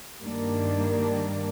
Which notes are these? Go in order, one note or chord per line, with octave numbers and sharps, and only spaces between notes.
G2 D#3 G3 A#3 D4